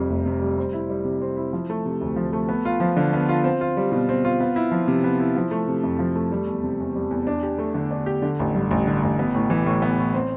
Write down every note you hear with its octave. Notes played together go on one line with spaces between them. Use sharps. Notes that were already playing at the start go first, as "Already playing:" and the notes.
Already playing: F2 C3 G3
F1
C3
G3
C4
E4
G3
C3
C4
E4
F3
A3
C3
D2
F3
A3
B3
F4
F3
D3
B3
F4
C4
F4
G3
B2
C4
F4
B3
E4
F3
C3
B3
E4
F3
A3
C3
F2
F3
A3
G3
E2
C3
E2
G3
E2
D4
G4
A3
D3
D4
G4
D3
A1
G2
A1
D3
A1
B3
A2
E3
A2
B3
A2
C4